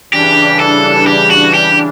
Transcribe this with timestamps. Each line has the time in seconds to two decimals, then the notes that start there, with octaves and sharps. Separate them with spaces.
0.12 C#3 E3 G3 D4 G4
0.60 A4
1.07 G4
1.30 F#4
1.54 G4